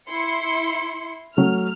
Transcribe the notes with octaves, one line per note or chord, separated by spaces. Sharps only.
E4 C6 C#7
F#3 A3 F6